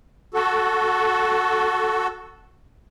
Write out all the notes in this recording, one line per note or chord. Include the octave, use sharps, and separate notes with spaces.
F#4 A4